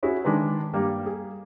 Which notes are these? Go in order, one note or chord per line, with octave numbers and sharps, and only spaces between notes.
C#4 E4 F#4 G#4
D#3 G#3 D4 B4
G2 G3 A#3
G#4